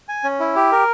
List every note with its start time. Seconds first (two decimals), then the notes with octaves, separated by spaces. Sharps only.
0.09 G#5
0.24 C#4
0.40 E4
0.56 G4
0.72 A#4